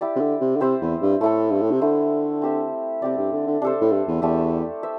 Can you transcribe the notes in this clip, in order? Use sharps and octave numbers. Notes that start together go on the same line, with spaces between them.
E4 G4 D5
C3
D3
C3
D3
C3 C4 E4 C5 E5
E2
G2
A2 A3 E4 A4
G2
A2
C3
D3 A3 E4 C5
C4 G4 C5 E5
C3 C4 G4 D5
G2
D3
D3
C3 D4 A4 C5
A2
G2
E2
E2 A3 D4 G4 E5
C5 E5